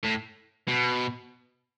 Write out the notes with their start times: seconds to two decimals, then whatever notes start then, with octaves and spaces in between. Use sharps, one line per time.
0.05 A2
0.68 B2